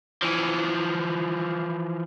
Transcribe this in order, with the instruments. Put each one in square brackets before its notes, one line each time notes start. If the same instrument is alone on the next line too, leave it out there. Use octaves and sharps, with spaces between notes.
[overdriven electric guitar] E3 F3